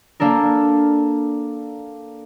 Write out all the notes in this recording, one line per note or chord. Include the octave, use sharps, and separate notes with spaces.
A#3 D4 A4 A#4